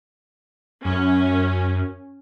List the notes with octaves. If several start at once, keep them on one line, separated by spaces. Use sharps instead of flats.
F#2 C#4